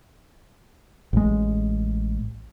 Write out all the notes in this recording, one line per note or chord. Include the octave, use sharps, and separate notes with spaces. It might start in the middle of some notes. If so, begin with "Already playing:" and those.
A1 G#3